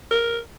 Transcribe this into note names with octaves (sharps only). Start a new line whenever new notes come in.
A#4